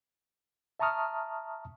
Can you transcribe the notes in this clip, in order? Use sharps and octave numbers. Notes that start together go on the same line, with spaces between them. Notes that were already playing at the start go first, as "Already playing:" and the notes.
E5 A5 A#5 C#6 D#6 F6